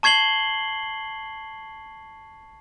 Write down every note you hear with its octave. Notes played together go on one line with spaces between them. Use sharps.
A5 C#6 G#6 C7 F#7 G7